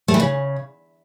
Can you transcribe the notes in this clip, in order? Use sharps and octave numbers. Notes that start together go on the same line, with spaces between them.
A3
E3
C#3